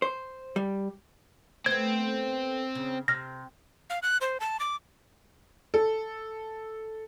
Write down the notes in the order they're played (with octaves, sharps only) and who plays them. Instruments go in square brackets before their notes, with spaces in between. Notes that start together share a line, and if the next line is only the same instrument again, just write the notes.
[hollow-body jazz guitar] C5
G3
[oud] A3 B3 [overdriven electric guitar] C4 [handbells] G#6
[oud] C#3
[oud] C3 [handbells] F6 A#6
[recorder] F5
F#6
C5
A5
D6
[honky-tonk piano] A4